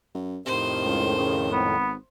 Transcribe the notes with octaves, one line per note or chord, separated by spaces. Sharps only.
F#2
F2 A2 C3 D#3 C5
C#2
C#3
G#1 B3